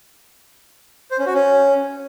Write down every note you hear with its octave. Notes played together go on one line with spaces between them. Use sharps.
C5
C#4
F#4
C#4